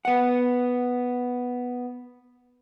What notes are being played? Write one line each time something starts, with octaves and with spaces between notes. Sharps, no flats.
B3 F#5